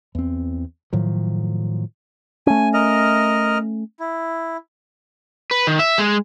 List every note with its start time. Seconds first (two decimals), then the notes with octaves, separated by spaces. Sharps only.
0.15 E2 C4
0.93 A2 D#3 F3 F#3
2.47 A3 C#4 G#5
2.74 A#4 D#5 F6
4.00 E4
5.51 B4
5.67 D#3
5.79 E5
5.99 G#3